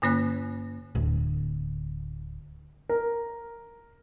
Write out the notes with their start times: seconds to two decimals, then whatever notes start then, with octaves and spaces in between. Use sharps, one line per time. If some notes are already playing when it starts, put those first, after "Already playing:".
0.02 G2 D3 A#3 C#4 C#5 F#6
0.95 D1 D2
2.89 A#4